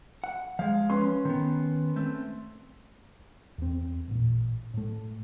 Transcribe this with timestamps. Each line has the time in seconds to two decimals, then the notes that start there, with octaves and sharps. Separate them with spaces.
0.24 F#5
0.59 F3 G#3 F5
0.90 C#4 B4 C6
1.25 D#3 B3
1.96 A3 C4
3.58 E2 C4
4.08 A1 A#2
4.74 A2 A3